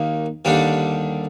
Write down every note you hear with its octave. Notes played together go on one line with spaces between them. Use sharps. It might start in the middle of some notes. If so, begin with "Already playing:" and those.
Already playing: D#2 D#3 A#3
D#2 D3 G3 D4